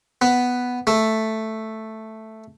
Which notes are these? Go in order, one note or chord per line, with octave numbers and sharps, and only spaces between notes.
B3
A3